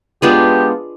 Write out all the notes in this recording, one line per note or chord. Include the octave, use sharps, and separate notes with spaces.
G#3 B3 D4 F4 G4